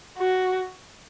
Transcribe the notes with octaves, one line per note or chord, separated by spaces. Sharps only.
F#4